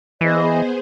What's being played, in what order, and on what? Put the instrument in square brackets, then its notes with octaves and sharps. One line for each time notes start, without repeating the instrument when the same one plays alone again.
[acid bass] E3 [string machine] B3 G#4 C5 [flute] D#5